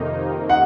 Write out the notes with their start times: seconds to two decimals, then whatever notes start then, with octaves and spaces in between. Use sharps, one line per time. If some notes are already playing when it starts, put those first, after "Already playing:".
Already playing: F2 C3 D#3 A#3 D#4
0.49 F#5